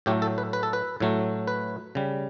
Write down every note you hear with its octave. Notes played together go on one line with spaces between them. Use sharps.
A2 F#3 A3 G4
A4
B4
B4
A4
B4
A2 F#3 A3
B4
C#3 G3